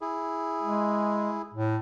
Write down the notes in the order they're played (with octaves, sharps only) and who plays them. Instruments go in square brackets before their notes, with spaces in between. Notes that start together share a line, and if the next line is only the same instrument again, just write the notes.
[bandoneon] E4 G#4
[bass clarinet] G#3
A2